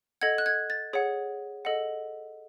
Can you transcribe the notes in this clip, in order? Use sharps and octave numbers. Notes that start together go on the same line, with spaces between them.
A4 D#5 F#5 G#6
F#6
G#6
A6
G#4 C#5 F#5
A4 D#5 F#5